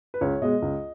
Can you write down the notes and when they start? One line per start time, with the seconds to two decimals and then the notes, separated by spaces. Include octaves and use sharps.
0.14 B4
0.21 C#2 C#5
0.41 B2 G#3 D#5
0.62 C#2